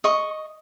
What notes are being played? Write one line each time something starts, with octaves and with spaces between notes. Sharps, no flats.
D#5 C#6